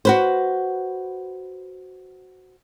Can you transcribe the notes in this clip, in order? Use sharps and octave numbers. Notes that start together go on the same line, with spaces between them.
F#4 B4 C5